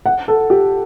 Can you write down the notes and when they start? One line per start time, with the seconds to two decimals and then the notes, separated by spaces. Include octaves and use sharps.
0.06 F#5
0.28 A4
0.50 G4